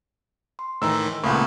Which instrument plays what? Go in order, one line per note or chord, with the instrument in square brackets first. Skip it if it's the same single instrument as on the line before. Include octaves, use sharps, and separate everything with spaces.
[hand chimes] C6
[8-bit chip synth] A2 D#3 E3 [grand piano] A#5 E6
[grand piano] C#2 A#2 [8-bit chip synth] A3 B3 [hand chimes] B5 C#6 D#6